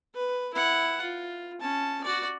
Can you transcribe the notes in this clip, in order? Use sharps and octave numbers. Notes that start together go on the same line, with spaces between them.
B4
E4 F#5
F4
C#4 A5
F#4 D5